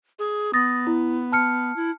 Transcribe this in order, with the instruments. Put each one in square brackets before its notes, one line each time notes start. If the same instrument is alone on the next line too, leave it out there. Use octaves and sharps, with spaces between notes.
[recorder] G#4
[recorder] B3 [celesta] D#6 A6 A#6
[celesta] E4
A5 F6 C#7
[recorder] E4